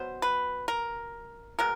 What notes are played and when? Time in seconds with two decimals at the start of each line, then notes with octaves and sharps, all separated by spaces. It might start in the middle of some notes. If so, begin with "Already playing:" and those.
Already playing: B2 F#3 B3 C5
0.22 B4
0.68 A#4
1.59 B2 G#3 A#4